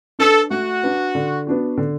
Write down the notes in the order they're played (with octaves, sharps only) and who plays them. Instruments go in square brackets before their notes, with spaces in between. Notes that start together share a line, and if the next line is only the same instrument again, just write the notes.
[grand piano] D4 B4 [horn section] A4
[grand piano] A3 [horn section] F#4
[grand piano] D4 B4
D3
B3 D4 F#4
D3